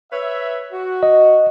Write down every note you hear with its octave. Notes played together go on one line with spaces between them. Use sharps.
B4 C#5 E5
F#4
D#5